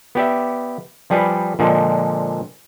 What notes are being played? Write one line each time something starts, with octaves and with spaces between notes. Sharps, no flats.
B3 G4 D5 E5
F3 G3 G#4 B4 D5
A#2 D3 F3 G#3